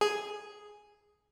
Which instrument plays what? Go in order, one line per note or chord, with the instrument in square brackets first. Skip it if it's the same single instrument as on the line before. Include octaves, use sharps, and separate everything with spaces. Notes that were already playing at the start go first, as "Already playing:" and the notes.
[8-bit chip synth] G#4